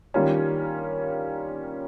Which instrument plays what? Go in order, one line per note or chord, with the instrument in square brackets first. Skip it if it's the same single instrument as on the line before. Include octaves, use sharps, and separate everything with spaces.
[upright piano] D#3 G3 A#3 C#4 F4